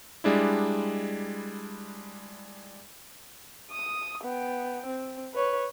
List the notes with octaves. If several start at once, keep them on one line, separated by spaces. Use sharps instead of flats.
G3 G#3 D4 E4
D#6
B3 G5
C4
B4 C#5